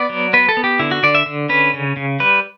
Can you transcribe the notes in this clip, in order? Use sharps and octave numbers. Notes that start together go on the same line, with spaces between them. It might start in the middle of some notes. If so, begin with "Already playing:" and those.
Already playing: B3 D5
F#3
B3 B4
A4
B3
G4
D3 E4
F#4
D3 D5
E5
D3
C#4 B4
C#3
C#3
G3 B4